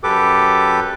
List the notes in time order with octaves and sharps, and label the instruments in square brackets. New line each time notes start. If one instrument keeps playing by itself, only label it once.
[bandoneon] F#2 G4 A4 B4 D6